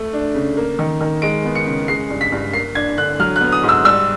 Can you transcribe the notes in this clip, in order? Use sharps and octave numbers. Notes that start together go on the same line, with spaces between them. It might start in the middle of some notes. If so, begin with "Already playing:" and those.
Already playing: A3
D4
C#3
A#3
D#3
D#3
G#3 D7
B3
C#7
C#3
G#3 C7
G2
B6
G2
A#3 C7
D4 G#6
D3 F#6
F#3 F6
F#6
B3
D#6
G#2
E6
G3 E6